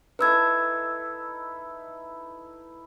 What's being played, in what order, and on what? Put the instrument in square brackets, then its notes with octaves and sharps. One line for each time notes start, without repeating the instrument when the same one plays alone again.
[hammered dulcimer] D#4 E4 A4 [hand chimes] B4 E6 G#6